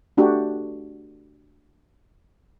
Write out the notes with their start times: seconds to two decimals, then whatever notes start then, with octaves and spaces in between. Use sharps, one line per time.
0.17 A3 D4 F#4 G4